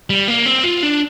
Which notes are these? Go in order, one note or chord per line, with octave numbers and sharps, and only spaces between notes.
G3
A#3
C4
F4
D4